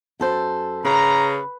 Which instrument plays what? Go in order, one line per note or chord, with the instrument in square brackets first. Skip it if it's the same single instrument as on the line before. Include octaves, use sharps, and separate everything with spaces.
[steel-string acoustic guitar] F#2 A4 C5
[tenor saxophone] C#3 [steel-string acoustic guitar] B4 [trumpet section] A#5